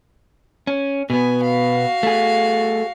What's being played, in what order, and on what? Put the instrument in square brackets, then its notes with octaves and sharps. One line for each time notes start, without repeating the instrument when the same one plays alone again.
[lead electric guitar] C#4
[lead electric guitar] B2 B3 [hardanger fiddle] G#5
[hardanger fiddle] F#4 F5
[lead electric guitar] A3 G#4